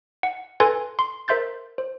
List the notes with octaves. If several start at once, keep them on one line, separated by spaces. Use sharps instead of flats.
F#5
A4 B4 G#5 C6 G#6 A6
C6
A#4 C5 E5 C6 G6 A6
C5